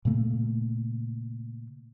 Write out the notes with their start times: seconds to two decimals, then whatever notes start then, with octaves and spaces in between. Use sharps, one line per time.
0.05 A#2 C#3 A3 A#3